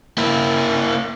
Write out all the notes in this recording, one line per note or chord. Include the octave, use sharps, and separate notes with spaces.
A#3 E4